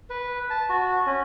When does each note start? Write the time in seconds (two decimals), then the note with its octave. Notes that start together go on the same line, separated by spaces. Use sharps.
0.10 B4
0.50 A5
0.69 F#4
1.07 C#4